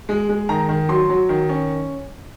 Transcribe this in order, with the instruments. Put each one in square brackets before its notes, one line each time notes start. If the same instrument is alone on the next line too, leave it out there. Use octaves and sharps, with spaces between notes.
[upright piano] G#3
G#3
D#3 A#5
D#3
F#3 C6
F#3
D#3
C#4